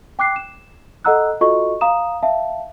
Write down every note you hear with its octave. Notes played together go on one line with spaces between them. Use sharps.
G5 D6 F#6 C7
E7
A4 D#5 F#5 A#5 E6 F#6
F4 F#4 A4 D#5 C#6
F5 A#5 D#6 E7
E5 F5 A5